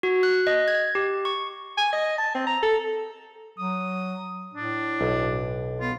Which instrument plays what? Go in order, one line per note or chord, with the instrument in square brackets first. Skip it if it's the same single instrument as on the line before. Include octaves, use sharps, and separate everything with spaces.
[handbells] F#4
F#6
D#5
G#6
G4
C#6
[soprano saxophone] G#5
D#5
A5
C4
A#5
A4
[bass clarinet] F#3 [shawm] D#6
[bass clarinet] A2 [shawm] D4
[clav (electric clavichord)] B1
[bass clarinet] B3 [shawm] F4